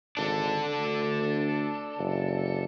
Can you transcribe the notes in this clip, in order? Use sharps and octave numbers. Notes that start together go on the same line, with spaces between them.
G#1 D4 A4
D2
F#1